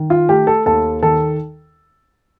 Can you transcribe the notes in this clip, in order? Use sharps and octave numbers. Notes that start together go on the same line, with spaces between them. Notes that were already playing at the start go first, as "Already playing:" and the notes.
Already playing: D#3
F4
A3 G4
A4
D#2 A4
D#3 A4